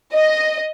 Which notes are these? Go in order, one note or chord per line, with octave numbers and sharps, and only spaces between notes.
D#5